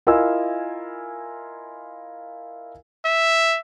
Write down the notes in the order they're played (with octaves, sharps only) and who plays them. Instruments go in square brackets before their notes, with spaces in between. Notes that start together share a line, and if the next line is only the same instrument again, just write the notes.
[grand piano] E4 F4 A#4 D#5 G#5 E6
[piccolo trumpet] E5